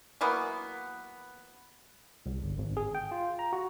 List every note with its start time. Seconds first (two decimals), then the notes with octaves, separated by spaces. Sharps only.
0.21 E3 F#3 A#3 B3
2.26 C2
2.42 G1
2.58 G#1
2.77 G#4
2.95 G5
3.12 F4
3.39 A#5
3.53 F#4